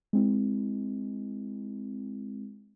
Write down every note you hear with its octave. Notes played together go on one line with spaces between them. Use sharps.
G#3 C4 E4